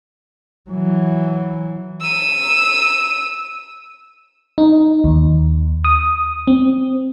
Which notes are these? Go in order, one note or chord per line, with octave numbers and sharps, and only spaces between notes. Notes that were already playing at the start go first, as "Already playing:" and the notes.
E3 F#3
E6 D#7
D#4
D#2
D#6
C4